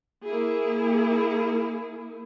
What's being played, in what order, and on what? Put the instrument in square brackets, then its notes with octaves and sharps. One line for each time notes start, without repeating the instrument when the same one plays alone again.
[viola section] A#3 E4 G#4